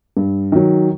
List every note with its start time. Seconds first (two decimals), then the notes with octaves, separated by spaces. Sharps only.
0.17 G2
0.52 D#3 F#3